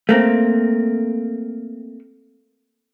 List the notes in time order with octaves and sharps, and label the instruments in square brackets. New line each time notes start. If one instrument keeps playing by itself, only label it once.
[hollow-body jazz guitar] A3 A#3 C4